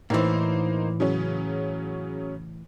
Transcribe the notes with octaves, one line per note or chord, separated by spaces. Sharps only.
A2 E3 A#3 D#4 C5
C#3 F#3 C#4